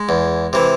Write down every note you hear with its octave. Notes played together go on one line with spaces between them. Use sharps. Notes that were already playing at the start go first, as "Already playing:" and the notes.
Already playing: G#3
E2
C3 E3